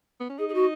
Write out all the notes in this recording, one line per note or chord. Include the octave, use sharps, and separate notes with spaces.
B3
C#4
D#4 G#4
G#4
F#4